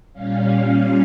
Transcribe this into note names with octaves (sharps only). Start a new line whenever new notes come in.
A#2 G3 C#4 F5
F5